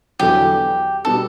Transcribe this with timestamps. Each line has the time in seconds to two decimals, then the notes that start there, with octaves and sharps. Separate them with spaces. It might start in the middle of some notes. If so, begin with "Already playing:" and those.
0.19 E2 D3 F#3 G4
1.05 B2 G3 A4